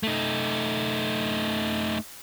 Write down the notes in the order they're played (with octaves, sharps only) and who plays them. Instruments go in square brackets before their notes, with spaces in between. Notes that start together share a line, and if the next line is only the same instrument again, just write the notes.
[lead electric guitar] A3 D#4